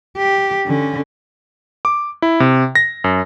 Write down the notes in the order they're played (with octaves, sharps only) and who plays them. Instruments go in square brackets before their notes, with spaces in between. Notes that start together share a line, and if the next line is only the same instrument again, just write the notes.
[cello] G4
D3 C#4
[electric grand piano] D6
E4
C3
A#6
F#2